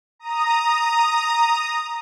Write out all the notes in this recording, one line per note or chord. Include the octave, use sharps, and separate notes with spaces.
A#5 D#6